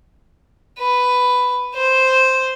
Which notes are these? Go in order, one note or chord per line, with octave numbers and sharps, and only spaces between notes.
B4
C5